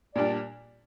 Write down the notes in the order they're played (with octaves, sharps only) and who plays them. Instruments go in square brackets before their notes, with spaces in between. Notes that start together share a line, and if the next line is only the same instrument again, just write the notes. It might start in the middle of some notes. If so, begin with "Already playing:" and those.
[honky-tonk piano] A#2 G3 D4 [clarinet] D5